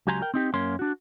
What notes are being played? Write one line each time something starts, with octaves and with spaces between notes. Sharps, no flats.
C#2 F#3 G4 G#5 A#5 C6
A#4 G5
C4 D#4 G4
F#2 A#3 C#4 C6
D4 F#4